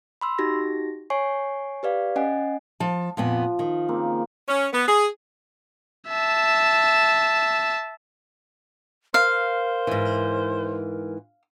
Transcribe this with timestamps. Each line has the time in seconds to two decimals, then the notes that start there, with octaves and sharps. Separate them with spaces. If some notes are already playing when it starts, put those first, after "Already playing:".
0.21 B5 C6 E6
0.39 D#4 F#4 G4 A#6
1.10 C#5 G#5 C#6 C7
1.83 G4 B4 D5 F5
2.16 C#4 D#5 F#5 G#5
2.80 F3 A5
3.17 F2 A#2 F3 B3
3.59 D#3
3.88 C#3 A#3 C4
4.49 C#4
4.73 B3
4.87 G#4
6.08 E5 A5
9.14 A#4 C5 F5
9.87 G#2 E3